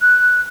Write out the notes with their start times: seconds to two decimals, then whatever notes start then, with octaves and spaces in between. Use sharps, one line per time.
0.01 F#6